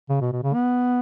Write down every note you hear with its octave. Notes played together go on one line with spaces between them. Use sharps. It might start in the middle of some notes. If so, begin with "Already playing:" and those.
C#3
B2
B2
C#3
B3